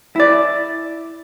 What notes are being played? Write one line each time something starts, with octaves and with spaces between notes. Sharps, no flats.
E4 D5